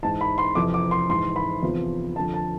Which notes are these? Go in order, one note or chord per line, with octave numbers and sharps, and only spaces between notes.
G#2 E3 A5
B5
C6
F2 C3 E3 D6
D6
C6
G#2 E3 C6
B5
E2 C3 F3
F2 D3 F3 A5
A5